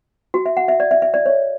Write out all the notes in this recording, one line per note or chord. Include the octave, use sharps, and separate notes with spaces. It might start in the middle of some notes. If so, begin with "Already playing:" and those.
F#4
E5
F#5
E5
D5
E5
E5
D5
C#5